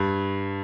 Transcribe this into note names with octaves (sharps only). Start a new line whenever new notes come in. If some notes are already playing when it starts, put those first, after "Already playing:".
Already playing: G2